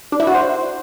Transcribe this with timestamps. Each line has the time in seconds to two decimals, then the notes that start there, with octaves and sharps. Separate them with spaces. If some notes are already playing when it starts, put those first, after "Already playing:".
0.12 D4
0.20 E4
0.27 F#4
0.35 C5